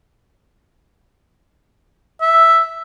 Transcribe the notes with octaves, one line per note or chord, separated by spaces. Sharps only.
E5